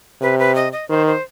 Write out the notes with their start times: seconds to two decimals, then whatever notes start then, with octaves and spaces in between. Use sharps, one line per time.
0.22 C3 B4
0.39 B4
0.55 D#5
0.72 D#5
0.89 D#3 C5
1.07 C5